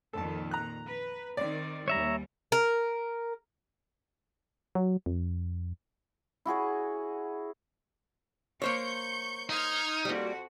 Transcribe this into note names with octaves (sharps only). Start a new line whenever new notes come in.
F2 A#2 D#3 A4 A5
A#5 F#6
B4
D#3 C4 D5
D#2 G3 C#5 E5 A#5
A#4
F#3
F2
E4 F#4 G#4 C#5
A#3 C5 C#5 C#6 G6
D#4 C6 F6 G#6
F2 G3 A#3 F#4